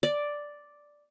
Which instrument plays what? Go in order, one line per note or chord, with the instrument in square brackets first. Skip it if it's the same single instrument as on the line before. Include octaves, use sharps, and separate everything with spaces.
[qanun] D5